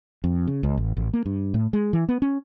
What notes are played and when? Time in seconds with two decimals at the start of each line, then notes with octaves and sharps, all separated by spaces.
0.24 F2
0.47 C#3
0.63 C#2
0.77 A1
0.97 A1
1.13 A#3
1.26 G2
1.54 A2
1.73 G#3
1.93 E3
2.09 B3
2.22 C#4